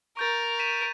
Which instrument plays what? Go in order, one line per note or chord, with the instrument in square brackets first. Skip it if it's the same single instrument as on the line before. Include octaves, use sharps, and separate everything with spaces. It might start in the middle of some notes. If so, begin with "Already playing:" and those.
[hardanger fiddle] A#4 [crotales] C#6 G6 A6
[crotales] B6 D#7 E7